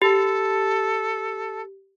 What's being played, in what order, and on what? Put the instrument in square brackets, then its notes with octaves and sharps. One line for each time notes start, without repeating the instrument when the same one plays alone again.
[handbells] G4 [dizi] A4